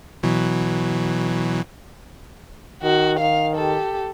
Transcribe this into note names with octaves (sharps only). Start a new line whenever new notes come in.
B2 E3 F#3
D#3 F#4
D#3 F5
G4 A4